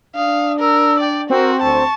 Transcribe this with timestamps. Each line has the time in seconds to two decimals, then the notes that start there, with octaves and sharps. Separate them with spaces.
0.16 D4 F5 D#6
0.60 A#4 E6
1.00 D5 G5
1.30 C4 F#4 A#4
1.62 D2 A5 C#6